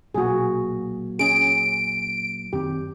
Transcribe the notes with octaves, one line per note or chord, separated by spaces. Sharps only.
B1 A#2 F#3 A#3 F#4 G#4
C#4 G#4 D7
F#2 D#3 C4 G4